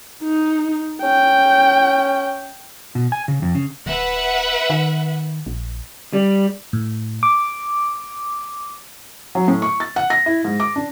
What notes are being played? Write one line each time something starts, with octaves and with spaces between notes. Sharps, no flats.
D#4
C#4 G5
B2
G#5
C#3
F2
C#3
D1 B4 E5 F#5
D#3
A#1
G3
A2
D6
F#3
A2
C#6
A6
F#5
A#6
E4
G#2
D6
D4